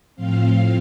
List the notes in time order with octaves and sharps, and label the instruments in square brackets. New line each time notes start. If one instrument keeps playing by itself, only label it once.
[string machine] A2 F3 C4 F5